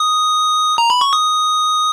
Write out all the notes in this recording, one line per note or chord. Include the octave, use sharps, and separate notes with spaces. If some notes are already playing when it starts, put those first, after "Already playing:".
Already playing: D#6
A#5
B5
C#6
D#6